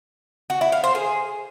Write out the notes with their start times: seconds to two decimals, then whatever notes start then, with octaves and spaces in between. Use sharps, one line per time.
0.50 F#4
0.61 E4
0.72 F5
0.84 C5
0.95 G#4